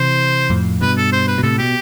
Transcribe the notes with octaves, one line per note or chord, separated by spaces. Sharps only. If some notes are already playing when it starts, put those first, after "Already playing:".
Already playing: C3 E3 C5
F2 A2
G2 B2 B4
A4
C5
B4
B2
A2 C3 A4
B2 G4